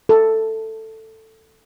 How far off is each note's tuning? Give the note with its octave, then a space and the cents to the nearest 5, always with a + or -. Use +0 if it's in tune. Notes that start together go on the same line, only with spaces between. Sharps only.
A4 +10